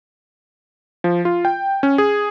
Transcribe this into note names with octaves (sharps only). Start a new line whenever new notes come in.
F3
F4
G5
C#4
G#4